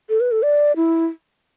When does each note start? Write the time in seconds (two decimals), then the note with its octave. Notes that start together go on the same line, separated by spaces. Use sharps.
0.09 A4
0.20 B4
0.32 A4
0.43 D5
0.76 E4